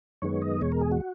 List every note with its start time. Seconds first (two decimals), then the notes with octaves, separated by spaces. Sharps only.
0.22 F#2 D#3 G#3 B3 C#5
0.42 D#5
0.61 E2 B2 G#3 C#5
0.72 A#4
0.81 G#4
0.92 F#4